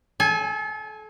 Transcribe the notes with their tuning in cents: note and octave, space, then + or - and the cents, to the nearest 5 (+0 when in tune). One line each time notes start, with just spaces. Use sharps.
A4 -35 G#5 +0